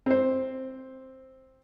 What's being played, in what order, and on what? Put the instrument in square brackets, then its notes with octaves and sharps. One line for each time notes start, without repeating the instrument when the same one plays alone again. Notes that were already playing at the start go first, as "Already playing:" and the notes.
[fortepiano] C4 C5